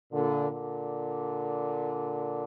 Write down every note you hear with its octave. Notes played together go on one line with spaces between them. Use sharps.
A#2 D3
A#2 D3